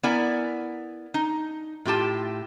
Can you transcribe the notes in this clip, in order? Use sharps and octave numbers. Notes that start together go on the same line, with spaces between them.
B3 E4 A#4 D5 G#5
D#4
A2 F4 G4 A5